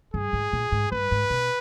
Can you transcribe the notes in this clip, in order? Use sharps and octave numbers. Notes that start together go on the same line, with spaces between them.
G2 G#4
G#2
A#2
G#2
G2 B4
G#2
B2